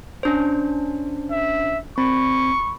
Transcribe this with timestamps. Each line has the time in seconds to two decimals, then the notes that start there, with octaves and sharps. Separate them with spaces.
0.23 C#4 D4 C5
1.31 E5
1.98 C4 B5 C#6